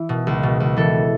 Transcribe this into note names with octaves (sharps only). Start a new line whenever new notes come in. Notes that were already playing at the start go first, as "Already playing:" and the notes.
Already playing: E3 E4
B2
C#2
B2
C#2
E3 A4